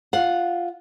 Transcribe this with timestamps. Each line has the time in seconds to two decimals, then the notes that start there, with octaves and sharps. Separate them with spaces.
0.13 F4 F5 F#5